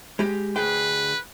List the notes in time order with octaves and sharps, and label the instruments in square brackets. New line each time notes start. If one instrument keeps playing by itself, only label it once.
[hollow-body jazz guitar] G#3 G4
[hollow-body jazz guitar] D2 G#4 G5 [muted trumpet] B4